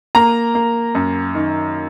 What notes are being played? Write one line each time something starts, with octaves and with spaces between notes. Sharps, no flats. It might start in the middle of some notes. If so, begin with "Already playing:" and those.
A#3 A#5
A#3
F#2
D#3